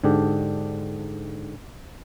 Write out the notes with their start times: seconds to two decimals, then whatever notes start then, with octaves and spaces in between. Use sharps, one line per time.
0.04 G#2 D3 D4 G4